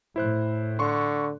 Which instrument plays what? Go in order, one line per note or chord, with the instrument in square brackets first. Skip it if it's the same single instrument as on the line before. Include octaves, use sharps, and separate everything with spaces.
[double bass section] A2 [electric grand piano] E4 C5 F#6
[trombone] D3 [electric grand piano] C6 C#6